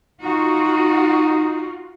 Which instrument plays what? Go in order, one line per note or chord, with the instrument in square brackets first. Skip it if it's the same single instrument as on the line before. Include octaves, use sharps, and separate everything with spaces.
[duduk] D#4 [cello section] F4 F#4